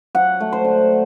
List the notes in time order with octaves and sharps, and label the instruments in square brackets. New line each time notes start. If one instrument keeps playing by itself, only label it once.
[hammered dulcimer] F#3 F#5
A3
C5
D3